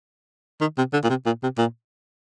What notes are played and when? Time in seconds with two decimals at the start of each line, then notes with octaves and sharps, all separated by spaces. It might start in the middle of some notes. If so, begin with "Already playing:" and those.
0.61 D#3
0.78 C3
0.93 D3
1.04 A#2
1.10 C3
1.26 A#2
1.43 C3
1.58 A#2